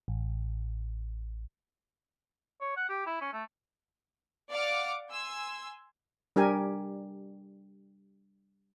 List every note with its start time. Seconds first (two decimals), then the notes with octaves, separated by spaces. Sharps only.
0.08 A1
2.61 C#5
2.77 F#5
2.89 G4
3.06 E4
3.21 C#4
3.33 A3
4.51 D5 F5 F#5 D6 F6
5.10 G#5 C6 E6
6.36 G3 D4 G4 A#4 G#5